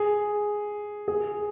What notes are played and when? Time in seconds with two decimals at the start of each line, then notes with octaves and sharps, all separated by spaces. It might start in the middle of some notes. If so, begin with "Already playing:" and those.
Already playing: G#4
1.08 G#4